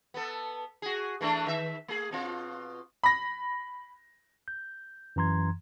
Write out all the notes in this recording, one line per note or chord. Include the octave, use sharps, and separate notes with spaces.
B3 A4
F#4 G#4
E3 A3 D4
D#3 E5
A3 G#4
B2 C4 F4
B5 A#6
G6
F#2 E3 A#5 C6 G#6